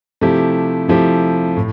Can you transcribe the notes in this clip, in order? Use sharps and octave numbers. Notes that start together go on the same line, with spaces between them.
C3 F3 A3 E4 G4
C3 F3 A3 E4 G4
A2